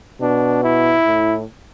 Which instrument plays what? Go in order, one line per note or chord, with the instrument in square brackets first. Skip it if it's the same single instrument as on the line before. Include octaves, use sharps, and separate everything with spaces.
[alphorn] B2 [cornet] D4
[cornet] E4
[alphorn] A2